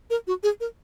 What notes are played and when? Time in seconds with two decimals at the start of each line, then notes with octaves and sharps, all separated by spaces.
0.10 A#4
0.27 F#4
0.43 G#4
0.60 A#4